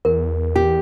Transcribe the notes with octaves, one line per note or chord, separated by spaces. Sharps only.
E2 A#4
G4